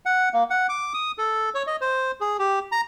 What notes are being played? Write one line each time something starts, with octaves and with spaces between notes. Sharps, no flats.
F#5
A#3
F#5
D6
D#6
A4
C#5
D#5
C5
G#4
G4
A#5